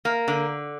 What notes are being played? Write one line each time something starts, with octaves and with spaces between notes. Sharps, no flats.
A#3
D3